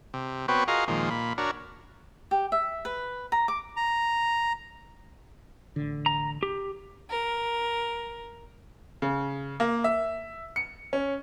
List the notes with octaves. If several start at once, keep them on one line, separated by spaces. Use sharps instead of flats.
C3
B3 C4 F#4 B4 C#5 G5
F4 F#4 G#4 A#4 D#5 F5
A#2 D#3 F3 G#3
A#2 B5
D4 F#4 A#4 C#5
G4
E5
B4
A#5
D6
A#5
A1 D3
A#5
G4
A#4
C#3
A#3
E5
C#7
C#4